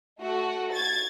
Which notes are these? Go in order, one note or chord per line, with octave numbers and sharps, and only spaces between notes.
A3 F#4
G#6 A6